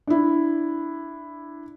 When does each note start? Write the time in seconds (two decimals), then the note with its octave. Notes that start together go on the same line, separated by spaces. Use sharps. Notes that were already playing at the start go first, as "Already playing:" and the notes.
0.07 D4 E4